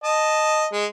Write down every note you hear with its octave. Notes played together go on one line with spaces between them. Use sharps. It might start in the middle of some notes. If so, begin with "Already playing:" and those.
D#5 A5
G#3